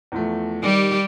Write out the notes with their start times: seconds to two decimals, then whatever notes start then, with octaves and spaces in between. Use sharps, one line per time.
0.12 E2 F3 A3
0.63 D#3 G3 G4